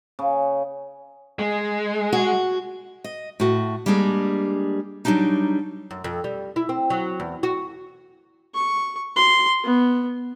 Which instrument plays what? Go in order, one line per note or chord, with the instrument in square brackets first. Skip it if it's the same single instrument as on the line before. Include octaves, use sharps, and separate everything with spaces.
[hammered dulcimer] C#3
[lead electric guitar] G#3
[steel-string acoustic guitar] F#4
D#5
A2 F#4
G3 G#3 A#3 D4 G#4
F#3 G3 A#3 D4 D#4
[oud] F#2
F2
G3
E4
C4
F#3
E2
F#4
[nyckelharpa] C#6
C6
B3